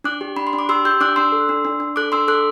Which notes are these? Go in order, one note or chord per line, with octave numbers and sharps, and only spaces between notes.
D4 D6 F#6
G4
D4 B5
C6
D4
D6
G4 C6 E6
G4 E6 G6
D4 D6 F#6
D4 C6 E6
A4
D4
D4
D4
A4 D6 F#6
D4 C6 E6
A4 D6 F#6